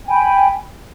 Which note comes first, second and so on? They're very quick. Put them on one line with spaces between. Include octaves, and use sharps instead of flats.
G#5 G5 B5